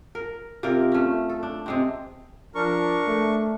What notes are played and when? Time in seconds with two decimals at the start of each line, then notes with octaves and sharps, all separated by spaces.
0.15 A#4
0.63 C3 F4 A#4 D5
0.92 A3 C#4
1.29 A4
1.43 D4
1.66 C3 G#3 C4
2.55 F3 D4 A#4 C#6
3.07 A3